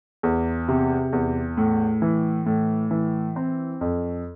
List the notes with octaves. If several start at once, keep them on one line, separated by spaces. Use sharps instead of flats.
E2
C3
E2
A2
E3
A2
E3
C4
F2